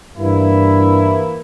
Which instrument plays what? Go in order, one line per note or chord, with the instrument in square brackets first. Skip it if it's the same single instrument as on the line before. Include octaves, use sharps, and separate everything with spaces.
[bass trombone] G2 [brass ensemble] E3 A#3 E4